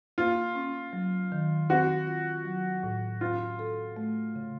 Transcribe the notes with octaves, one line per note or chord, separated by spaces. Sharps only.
A#3 F4
C#4
F#3
D#3
C4 F#4
F4
F#3
A2
C#4 F4
A4
A3
C#3